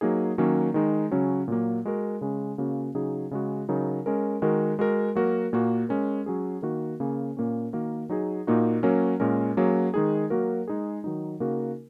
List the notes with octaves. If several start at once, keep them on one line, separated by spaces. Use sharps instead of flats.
F#3 A#3 D#4 G#4
D#3 F#3 A#3 C#4
D#3 G#3 D#4
C#3 F#3 C#4
A#2 F#3 A#3
G#3 F#4 A#4
C#3 G#3 C#4
C#3 A#3 C#4 F#4
C#3 F#3 D#4 G#4
C#3 G#3 F#4
C#3 F#3 D#4 A#4
G#3 C#4 A#4
D#3 G#3 F#4 A#4
G#3 F#4 A#4
F#3 A#3 F#4 A#4
A#2 A#3 F#4 A#4
G#3 C#4 A#4
F#3 C#4 G#4
D#3 A#3 F#4 A#4
C#3 A#3 C#4 G#4
A#2 A#3 C#4
D#3 A#3 F#4 A#4
F#3 D#4 G#4
A#2 A#3 D#4 F#4
F#3 A#3 C#4 A#4
A#2 G#3 C#4 A#4
F#3 A#3 C#4 G#4
D#3 G#3 D#4 G#4
F#3 A#3 F#4 A#4
G#3 D#4 G#4
D#3 F#3 D#4
C#3 A#3 D#4 F#4 A#4